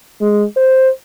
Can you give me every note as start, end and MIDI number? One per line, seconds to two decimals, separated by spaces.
0.21 0.45 56
0.56 0.89 72